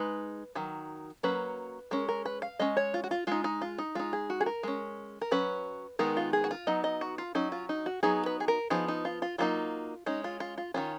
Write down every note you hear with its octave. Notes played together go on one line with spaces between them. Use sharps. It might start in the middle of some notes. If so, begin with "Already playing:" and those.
Already playing: G#3 D#4 B4
D#3 F#3
F#3 A#3 C#4 B4
G#3 C#4 A#4
A#4
B4
F5
G#3 C#4 D#5
C#5
F4
F#4
F4
G#3 D#4 F4
D#4
F4
D#4
G#3 D#4 F4
G#4
F#4
G#4
A#4
G#3 C#4
A#4
F#3 C#4 B4
D#3 G#3 B3 D#4 A#4
F4
G#4
F#4
F4
F#3 B3 D#4 D#5
D#5
F#4
F4
F#3 C#4 D#4
F4
D#4
F#4
F#3 B3 D#4 G#4
B4
G#4
A#4
F3 B3 D#4 G#4
D#4
F4
F4
F#3 A#3 D#4 F4
G#3 C#4 D#4
F4
F4
F4
D#3 F#3 C#4 F4